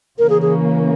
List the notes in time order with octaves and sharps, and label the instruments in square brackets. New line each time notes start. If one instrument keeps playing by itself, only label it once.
[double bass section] C#3 E3 A#3 C#4 [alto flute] A#4
[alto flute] G#4
G#4